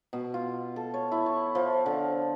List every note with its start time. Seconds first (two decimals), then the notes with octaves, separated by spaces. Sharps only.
0.13 B2
0.34 F4
0.76 A4
0.94 C#5
1.12 E4
1.26 C#6
1.55 F3
1.86 D3